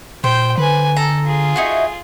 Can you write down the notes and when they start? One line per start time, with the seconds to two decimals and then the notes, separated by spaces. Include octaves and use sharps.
0.24 A#2 C5 G5
0.58 D3 B4 G#5
0.97 A4 A#5
1.25 F4 G#4
1.56 D#4 E4 F#4